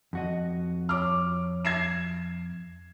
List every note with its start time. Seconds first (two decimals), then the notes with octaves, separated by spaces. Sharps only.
0.13 F2 F#4 D#5
0.89 C#5 D6 F6
1.65 G#6 C7 E7